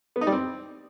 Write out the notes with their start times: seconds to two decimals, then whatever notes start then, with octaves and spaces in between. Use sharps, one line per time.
0.16 B3
0.21 D#4
0.27 G3
0.32 C4